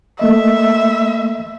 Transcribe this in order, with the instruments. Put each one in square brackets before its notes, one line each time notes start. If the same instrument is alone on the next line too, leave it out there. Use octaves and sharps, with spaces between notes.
[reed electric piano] A3 A#3 D#5 [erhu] E5